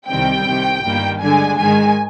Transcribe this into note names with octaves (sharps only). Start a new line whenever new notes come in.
C2 C3 D#3 G3 C4 G5
C2 C3 D#3
G1 G2 D#3 G3 A#3
G2 D3 G#3 D4 G#5
G#2 D#3 G#3 G#5